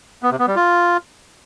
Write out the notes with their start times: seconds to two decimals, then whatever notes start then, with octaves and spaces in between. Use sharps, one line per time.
0.23 B3
0.31 C3
0.39 B3
0.47 G3
0.56 F4